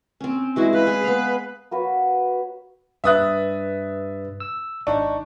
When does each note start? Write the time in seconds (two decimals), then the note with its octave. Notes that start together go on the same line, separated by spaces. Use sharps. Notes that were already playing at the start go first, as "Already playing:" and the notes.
0.21 C4 C#4
0.56 E3 G#3 E4 F#4
0.73 B4 F5
0.87 G#4
1.03 B3 F5
1.71 A#3 F#4 B4 C#5
3.04 G2 B4 E5 D#6 F#6 A6
4.40 E6
4.87 G#1 D4 D#4 C#6